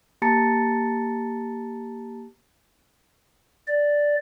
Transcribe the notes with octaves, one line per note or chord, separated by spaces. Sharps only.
A#3 G4 A5 A#5 A6 C#7
D5